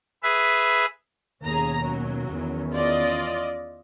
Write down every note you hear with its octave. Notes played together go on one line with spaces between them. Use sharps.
G#4 B4 E5
D#2 B2 C#4 G#4 A#5
F#3
E2 D#3 C#4
F4 D5 D#5